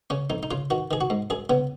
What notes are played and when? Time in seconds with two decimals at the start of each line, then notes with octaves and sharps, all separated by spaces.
0.10 C#3 C#4
0.30 F2 D#4
0.43 D#4
0.51 C#3 F4
0.70 D#3 F#4
0.91 D#3 G#4
1.01 F#4
1.10 G#2
1.30 F#2 G#4
1.50 C#3 B3